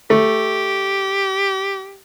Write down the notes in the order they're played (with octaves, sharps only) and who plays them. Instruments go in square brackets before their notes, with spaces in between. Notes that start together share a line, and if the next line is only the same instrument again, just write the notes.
[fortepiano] A3 [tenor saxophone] G4